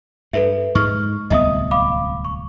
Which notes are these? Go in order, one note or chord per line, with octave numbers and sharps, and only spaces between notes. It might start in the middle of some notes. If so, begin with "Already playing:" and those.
G2 A4 B4 E5
G#2 G#3 C#6 F6
D1 C2 B3 D#5 E5 D#6
F5 B5 D6
C#6